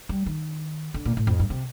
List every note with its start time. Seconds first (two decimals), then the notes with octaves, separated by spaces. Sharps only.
0.09 G3
0.26 D#3
0.94 D3
1.05 A#2
1.17 A2
1.27 F2
1.40 G2
1.50 C3